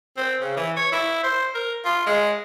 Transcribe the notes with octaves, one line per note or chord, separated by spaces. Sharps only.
C4
C#3
E3
C#5
E4
C5
A#4
F4
G#3